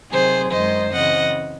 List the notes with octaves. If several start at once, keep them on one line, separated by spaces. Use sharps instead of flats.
C3 D#3 F#3 C4 G#4 C5
F#2 D#3 G#3 C5 D#5
C#3 E3 C4 D#5 F#5